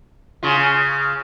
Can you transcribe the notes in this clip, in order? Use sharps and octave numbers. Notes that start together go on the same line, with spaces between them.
C#3 F4